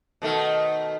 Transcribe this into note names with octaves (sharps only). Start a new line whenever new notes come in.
B2 D#3 A3